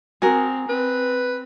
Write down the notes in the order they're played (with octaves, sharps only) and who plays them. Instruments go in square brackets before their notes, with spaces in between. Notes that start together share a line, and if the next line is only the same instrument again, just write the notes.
[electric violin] C4 [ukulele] F#4 A#4 [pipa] G#4
[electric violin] C4 [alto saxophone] B4